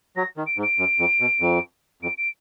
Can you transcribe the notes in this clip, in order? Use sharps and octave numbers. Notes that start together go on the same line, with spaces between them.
F#3 A#6
D#3
D7
G#2
D7
F#2
F2
B2
F2
F2 D7
D7